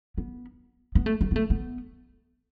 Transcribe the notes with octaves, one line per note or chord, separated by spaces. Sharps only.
B3
B3
A3
G3
B3
A3
B3